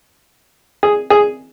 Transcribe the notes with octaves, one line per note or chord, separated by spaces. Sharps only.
G#4
G#4